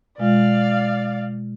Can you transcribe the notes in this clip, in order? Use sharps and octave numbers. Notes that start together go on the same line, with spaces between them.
B2 G#3 F4 D5 F5